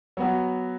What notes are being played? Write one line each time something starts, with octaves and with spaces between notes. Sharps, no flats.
F#3 B3 F#4